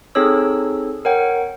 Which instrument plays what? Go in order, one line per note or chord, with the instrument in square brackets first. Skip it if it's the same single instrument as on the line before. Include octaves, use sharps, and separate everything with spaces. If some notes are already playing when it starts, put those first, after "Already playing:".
[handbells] C4 D#4 G#4 A4 C#5 E6
A#4 C#5 F#5 G5